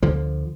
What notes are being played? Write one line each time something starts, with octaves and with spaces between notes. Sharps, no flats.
D2 D3 F3